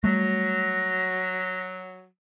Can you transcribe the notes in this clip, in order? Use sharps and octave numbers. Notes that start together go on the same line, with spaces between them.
F#3 G3 A3 A#6